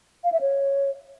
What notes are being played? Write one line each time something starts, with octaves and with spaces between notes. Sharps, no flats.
F5
E5
C#5